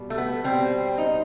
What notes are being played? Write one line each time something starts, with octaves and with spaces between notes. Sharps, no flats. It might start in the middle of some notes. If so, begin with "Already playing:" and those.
Already playing: B2 G3
A3
B3
B2 G3 C4
D#4